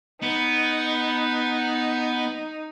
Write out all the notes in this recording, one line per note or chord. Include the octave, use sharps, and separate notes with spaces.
B3 D#4